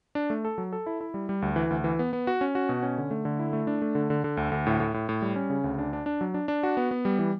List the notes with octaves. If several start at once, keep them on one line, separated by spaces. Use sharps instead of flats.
D4
A3
A4
F#3
A4
E4
E4
G3
G3
D2
E3
D2
E3
B3
B3
F#4
C#4
F#4
B2
C#4
D3
A3
D3
E4
A3
D4
A3
D3
D3
D3
D2
D2
A2
A2
A2
A2
G3
C#4
C#3
D2
D4
D4
D4
F#3
D4
D4
F#4
B3
B3
G3
E3